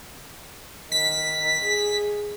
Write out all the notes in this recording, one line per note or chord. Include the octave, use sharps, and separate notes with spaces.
D#3 B6
G#4